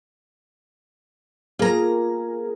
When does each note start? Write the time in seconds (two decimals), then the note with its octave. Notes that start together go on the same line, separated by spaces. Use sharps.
1.59 A#3 F4 G#4 A#4 A#5